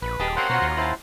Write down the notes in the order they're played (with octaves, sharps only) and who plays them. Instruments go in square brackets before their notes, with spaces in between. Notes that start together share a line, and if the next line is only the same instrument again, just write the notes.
[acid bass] A#1 [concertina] B4
[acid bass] D#1 [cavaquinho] G4 D#5 A5 [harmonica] G#4
[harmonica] A#3 C4 C#4 [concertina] C5 F#5
[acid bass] B2 [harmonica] C#4 F4 A#5 [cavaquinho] F#4 C#5
[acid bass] D#2
[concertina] E4 C5 [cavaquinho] F#5 A5